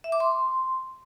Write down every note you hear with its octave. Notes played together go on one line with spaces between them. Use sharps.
E5
D6
C6